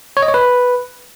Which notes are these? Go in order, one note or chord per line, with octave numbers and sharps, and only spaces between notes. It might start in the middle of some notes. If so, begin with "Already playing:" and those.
C#5
D#5
C#5
B4